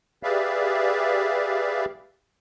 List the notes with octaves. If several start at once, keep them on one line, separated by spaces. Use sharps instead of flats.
G4 G#4 B4 D5 E5 F5